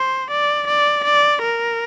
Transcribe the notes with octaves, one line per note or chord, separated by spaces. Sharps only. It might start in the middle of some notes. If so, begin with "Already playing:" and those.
Already playing: C5
D5
D5
D5
A#4